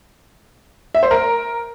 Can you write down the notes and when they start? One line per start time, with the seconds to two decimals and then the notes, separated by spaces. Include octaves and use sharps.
0.95 E5
1.03 C5
1.11 A#4